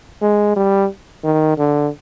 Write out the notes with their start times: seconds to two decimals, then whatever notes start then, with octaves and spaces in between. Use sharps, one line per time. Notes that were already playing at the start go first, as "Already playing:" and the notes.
0.21 G#3
0.56 G3
1.24 D#3
1.58 D3